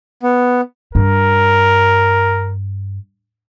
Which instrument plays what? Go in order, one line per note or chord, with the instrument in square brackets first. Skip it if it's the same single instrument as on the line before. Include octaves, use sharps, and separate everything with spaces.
[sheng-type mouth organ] B3
[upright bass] G2 [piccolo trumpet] A#4